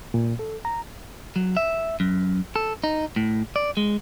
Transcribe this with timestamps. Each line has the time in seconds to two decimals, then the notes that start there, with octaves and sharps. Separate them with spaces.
0.14 A#2
0.39 A4
0.65 A#5
1.36 F#3
1.57 E5
2.00 F#2
2.56 A4
2.84 D#4
3.16 A2
3.56 D5
3.77 G#3